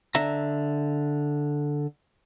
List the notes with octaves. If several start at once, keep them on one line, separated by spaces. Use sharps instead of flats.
D3 E5 A#5